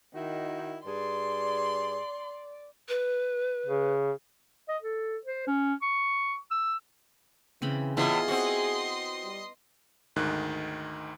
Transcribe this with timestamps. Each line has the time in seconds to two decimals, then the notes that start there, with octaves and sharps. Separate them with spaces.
0.14 D#3 D#4 E4 F#4
0.86 G2 G#4 D5 C6
2.89 B4
3.66 C#3
4.69 D#5
4.82 A4
5.25 C5
5.47 C#4
5.82 C#6
6.51 E6
7.62 C#3 E3 C4 B5
7.97 A2 E3 B3 E4 F4 G#4 D#5 C6
8.28 C4 F#4
9.24 G3
10.16 D2 G#2 D#3 F#6